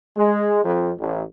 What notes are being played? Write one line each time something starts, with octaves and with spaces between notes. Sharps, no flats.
G#3
F2
A1